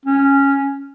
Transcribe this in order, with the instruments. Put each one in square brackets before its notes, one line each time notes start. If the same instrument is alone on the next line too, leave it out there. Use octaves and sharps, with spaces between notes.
[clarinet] C#4